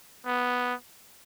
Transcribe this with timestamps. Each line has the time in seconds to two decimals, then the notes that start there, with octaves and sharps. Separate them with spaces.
0.26 B3